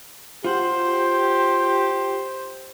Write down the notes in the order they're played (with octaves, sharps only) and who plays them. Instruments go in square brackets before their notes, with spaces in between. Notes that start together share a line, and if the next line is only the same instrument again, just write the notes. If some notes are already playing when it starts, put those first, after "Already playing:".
[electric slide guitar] F4 F#5 [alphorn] G4 [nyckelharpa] C5